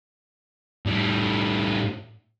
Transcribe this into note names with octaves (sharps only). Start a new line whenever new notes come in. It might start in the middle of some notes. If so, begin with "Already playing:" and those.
A2 G3